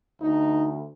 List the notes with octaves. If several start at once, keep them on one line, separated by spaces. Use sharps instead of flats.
D2 D#4